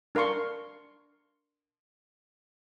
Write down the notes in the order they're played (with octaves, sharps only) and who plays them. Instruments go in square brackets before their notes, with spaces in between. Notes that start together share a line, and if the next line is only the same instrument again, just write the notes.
[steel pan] D4 A#4 F5 C6 C#6